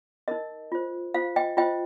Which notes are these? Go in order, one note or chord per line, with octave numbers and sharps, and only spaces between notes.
D#4 A#4 D#5
F4 C5
F4 C5 F5
D#5 G5
F4 C5 D#5 G5